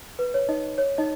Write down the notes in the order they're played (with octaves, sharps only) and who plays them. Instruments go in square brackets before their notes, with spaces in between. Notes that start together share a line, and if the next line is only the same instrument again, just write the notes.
[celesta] B4
C#5
D#4 D#5
C#5
D#4 D#5